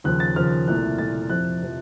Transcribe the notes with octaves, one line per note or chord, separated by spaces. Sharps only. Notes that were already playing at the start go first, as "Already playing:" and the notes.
D#2 C#3 F3 F#6
A6
D#2 C#3 F3 F6
C2 A#2 A3 F#6
C2 A#2 A3 A6
F2 C3 F3 F#6
C3 F3